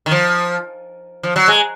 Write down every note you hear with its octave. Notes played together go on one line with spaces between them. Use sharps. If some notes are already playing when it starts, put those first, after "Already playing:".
D#3
F3
F3
F#3
G#3